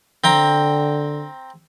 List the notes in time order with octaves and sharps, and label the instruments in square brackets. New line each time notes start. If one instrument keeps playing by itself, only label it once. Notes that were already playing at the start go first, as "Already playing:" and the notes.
[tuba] D3 [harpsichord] C4 G5 A#5